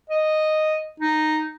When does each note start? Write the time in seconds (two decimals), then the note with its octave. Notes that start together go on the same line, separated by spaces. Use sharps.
0.10 D#5
1.00 D#4